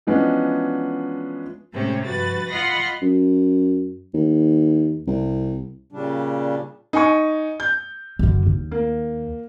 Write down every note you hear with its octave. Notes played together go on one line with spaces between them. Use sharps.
E3 F3 G#3 B3 C#4 D4
A2 C3 G#3 C4 C#4 G4
G2 F3 F#4 B4 A6
F4 D#5 F#5 B5 C6 A#6
F#2
D#2
C2
A#2 C#3 G3 D4
D#4 G#5 C#6
G6
F#2 D3
D#2
A#3